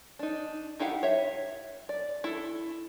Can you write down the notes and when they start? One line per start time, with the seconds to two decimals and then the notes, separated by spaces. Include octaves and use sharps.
0.19 D4 D#4
0.80 D#4 E4 G4 F5 F#5
1.03 C#5 E5
1.89 D5
2.24 E4 A4